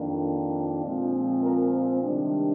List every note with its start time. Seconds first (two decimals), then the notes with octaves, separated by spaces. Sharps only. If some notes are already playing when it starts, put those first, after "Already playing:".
Already playing: F2 D#3 A#3 D4
0.83 A#2 F3 G#3 C4
1.43 A#4
2.03 C3 D#3 G3 D4